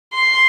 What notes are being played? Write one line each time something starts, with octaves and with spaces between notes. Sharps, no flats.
C6